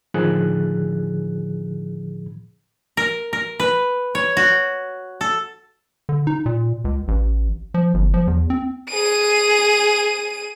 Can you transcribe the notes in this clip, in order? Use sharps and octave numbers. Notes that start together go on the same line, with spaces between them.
A2 D3 D#3 F3 G#4 F#6
A#4
A#4
B4
C#5
F#4
A4
D3
D#4
A#2
C#2
A1
F3
G1
F3
E2
C4
G#4 D#7